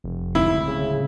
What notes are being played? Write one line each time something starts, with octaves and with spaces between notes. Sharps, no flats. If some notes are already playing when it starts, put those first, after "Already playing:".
F1
D1 C#2 C4 E4
C#3